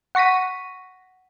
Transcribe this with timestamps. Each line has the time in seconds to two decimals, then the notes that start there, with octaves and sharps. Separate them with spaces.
0.15 F#5 C#6 A#6 B6 D#7